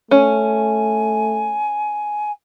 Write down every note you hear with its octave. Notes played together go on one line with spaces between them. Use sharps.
A3 C#4 G#5